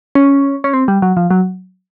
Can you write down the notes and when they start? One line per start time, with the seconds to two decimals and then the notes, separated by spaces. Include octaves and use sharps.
0.15 C#4
0.64 C#4
0.74 C4
0.88 G3
1.02 F#3
1.17 F3
1.31 F#3